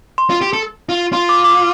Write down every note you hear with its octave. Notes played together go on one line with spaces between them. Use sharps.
C6
F4
G4
A4
F4
F4 C6
D6
D6